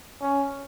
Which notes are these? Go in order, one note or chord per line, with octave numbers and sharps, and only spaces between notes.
C#4